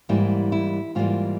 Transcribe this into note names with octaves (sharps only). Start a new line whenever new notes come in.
G#2 E3 G3 A#3 E4
E4
G#2 E3 G3 A#3 F4